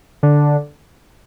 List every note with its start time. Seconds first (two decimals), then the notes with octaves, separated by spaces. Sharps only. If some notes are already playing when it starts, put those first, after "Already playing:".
0.23 D3